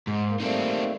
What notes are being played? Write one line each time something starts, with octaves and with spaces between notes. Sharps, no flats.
G#2
A#3
G3 A3 A#3 C4 D#4